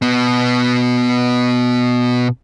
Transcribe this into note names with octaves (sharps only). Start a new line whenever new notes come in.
B2 B3